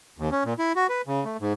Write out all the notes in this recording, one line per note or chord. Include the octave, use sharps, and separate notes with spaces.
D#2
C#4
A#2
E4
F#4
B4
C#3
A3
G#2